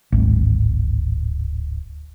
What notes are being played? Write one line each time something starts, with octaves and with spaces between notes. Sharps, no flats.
D1 G#1